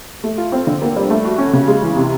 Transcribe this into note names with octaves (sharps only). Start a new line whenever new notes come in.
A3
F4
C4
D3
A#3
G3
A3
F#4
C#4
C#3
G#3
E3
C3